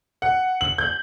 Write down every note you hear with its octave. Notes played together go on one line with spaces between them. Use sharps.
F#5
F#7
G6